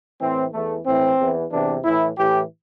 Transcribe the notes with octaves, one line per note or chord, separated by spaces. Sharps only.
A2 E3 C4
E2 E3 A3
A2 E3 C4
E2 E3
E2 C3 E3 D4
A2 E3 E4
A2 E3 G4